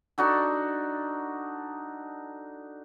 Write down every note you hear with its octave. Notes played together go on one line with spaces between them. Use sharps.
D4 D#4 F#4 A4